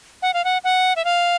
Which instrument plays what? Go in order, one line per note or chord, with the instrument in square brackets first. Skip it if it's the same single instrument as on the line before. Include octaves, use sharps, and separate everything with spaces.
[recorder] F#5
F5
F#5
F#5
E5
F5